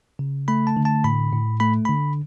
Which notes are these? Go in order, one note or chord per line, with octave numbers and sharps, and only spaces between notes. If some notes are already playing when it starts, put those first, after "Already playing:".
C#3
A3 B5
A5
D3
A5
A2 B5
A2
A3 B5
D3 B5